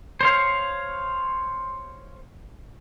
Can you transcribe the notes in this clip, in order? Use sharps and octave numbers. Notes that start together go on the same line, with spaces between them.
C5 C#5 F5